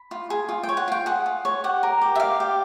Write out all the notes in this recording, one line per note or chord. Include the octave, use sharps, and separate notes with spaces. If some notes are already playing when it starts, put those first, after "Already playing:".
Already playing: B5
F4
G#4
F4
G5
C#5
F#5
F4 G5
G#4 F#5
F4
C#5
G4 F#5
A#4
G4
E5
D5 F5
G4